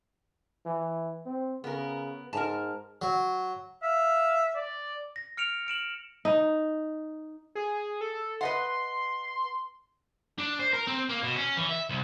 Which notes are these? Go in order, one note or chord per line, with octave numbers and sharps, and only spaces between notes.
E3
C4
C#3 B3 A#4
G#2 A#4 A5
F#3
E5 F5
D5
A#6
F6 C#7 D7 F7
F6 D7 E7 F#7
D#4
G#4
A4
B4 D#5 F#5 C6
D4
C5
A#4
C4
A#3
B2
C#4
E3
E5
C2